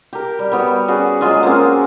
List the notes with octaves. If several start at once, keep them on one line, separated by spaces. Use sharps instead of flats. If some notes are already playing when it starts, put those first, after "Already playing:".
G4 A#4
G3
G3 B3 F#4 C#5
C#4 F#4 G#4 D5
F#3 G#3 F4 G#4
A#3 C4 C#4 F#4